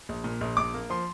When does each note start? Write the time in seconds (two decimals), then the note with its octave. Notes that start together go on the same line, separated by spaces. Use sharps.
0.09 A#1
0.24 A#2
0.41 A#1
0.57 A#1 D6
0.74 A#3
0.90 F3 C6